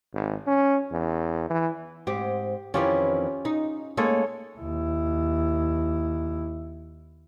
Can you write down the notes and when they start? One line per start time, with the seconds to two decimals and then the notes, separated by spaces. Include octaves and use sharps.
0.14 G#1
0.47 C#4
0.92 E2
1.50 E3
2.07 G#2 C4 G4
2.74 F2 D#3 E3 C#4 F4 G4
3.45 D#4
3.97 G#3 A#3 D#4 A4 C#5
4.60 D#2 E4